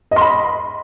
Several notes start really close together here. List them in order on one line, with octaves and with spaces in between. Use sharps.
D#5 C6 B5